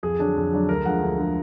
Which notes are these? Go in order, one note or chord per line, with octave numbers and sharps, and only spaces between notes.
F2 G#4
D3 F#3 D4
F2
D3 F#3 D4
D2 A#4
D3 F3 G#3 F#5
D2
D3 F3 G#3